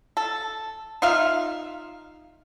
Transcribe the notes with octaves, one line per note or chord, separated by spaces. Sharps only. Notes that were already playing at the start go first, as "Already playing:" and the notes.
A4
D#4 F4 E5 F5